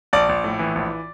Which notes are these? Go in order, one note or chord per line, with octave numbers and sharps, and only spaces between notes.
A#1 D5
A#1
A2
E3
A#1